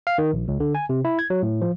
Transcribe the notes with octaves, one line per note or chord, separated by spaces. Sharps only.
F5
D#3
A#1
C#2
D3
G#5
C3
E4
G#6
F#3
A2
F3